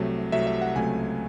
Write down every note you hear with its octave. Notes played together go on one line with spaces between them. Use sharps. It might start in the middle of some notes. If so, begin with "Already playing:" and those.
Already playing: C2 C3 F#3 A3
C2 C3 F#3 A3 E5
E5
F#5
C#2 C3 F#3 A3 G#5